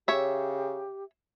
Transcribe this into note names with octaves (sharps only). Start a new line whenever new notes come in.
C#3 G4 C#5 E5